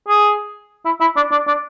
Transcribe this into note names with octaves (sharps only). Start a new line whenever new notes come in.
G#4
E4
E4
D4
D4
D4